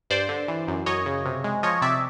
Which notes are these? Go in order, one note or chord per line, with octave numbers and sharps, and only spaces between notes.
G2 C5 D5
D3
E3
F#2
F#2 C#5 D#5
C#3
C3
G#3
F3 C#5 D#5
C3 D5 E5